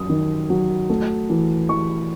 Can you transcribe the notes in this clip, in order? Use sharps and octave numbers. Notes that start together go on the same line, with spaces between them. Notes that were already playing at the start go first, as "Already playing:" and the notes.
Already playing: F#2 F#3 D#6
D#3
F#3
A3
E3
E3 C#6